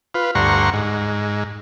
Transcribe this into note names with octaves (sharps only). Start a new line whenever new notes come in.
F4 B4
D2 G2 F#5 A#5 C6 C#6
G#2